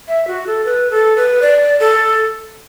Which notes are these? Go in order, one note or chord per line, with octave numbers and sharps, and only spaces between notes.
E5
F#4
A4
B4
A4
B4
D5
A4